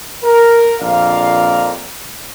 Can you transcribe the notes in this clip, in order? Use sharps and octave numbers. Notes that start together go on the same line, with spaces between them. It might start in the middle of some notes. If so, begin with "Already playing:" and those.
A#4
A#1 F2 A#4 D5 F5